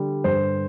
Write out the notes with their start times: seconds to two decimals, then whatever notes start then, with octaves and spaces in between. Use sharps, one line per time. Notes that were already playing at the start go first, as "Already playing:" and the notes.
Already playing: D3 G3
0.24 G2 C5